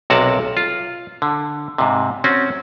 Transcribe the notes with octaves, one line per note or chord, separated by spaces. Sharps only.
B1 C3 F#4 A#4 F#5 A5
F4
D3
G#2 C3
C4 C#4 F#4